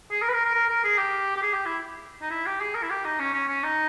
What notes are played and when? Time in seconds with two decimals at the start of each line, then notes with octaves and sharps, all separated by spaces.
0.11 G#4
0.22 A#4
0.29 B4
0.33 A#4
0.44 A#4
0.55 A#4
0.69 A#4
0.85 G#4
0.99 G4
1.37 G4
1.43 G#4
1.54 G4
1.66 E4
2.22 D#4
2.31 E4
2.46 G4
2.61 G#4
2.75 A#4
2.83 E4
2.90 G4
3.05 D#4
3.20 C#4
3.34 C#4
3.48 C#4
3.63 D#4